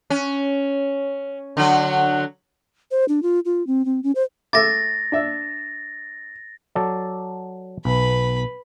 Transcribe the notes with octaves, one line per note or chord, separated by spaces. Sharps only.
C#4
D3 F#3
C5
D4
F4
F4
C4
C4
C#4
C5
A3 E5 D6 A6 A#6
D4 E5
F#3 A4 D5
B1 B4 B5